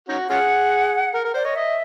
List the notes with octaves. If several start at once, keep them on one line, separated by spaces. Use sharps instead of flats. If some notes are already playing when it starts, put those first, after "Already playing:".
C#4 D#4 F#4
C#4 F4 G#4 F#5
A#4
A#4
C5 D5
C#5 D#5
D#5 E5